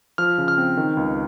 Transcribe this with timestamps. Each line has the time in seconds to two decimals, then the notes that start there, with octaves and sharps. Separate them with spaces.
0.18 F3 F6
0.38 C#3
0.48 F6
0.58 C4
0.77 D#3
0.97 C#2